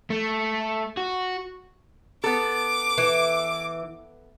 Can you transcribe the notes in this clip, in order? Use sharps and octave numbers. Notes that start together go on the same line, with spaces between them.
A3
F#4
B3 A4 D6
E3